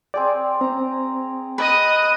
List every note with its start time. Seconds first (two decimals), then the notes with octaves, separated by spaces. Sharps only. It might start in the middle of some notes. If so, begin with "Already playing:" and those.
0.14 C4 G#4 D5 G5
0.61 C4 A#5
1.58 B4 D#5 D#6